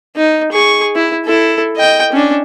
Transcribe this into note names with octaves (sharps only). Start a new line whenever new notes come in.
D#4
G#4 C#6
E4
E4 A4
D#5 G5
C#4 D4